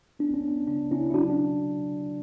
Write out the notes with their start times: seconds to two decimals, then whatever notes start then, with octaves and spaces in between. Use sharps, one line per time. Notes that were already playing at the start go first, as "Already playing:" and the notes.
0.19 B3 D4
0.34 C#4
0.44 B3 D4
0.67 C#3 D4
0.91 C#3 C#4 E4
1.10 E4
1.14 F#3 D4 F#4
1.30 D4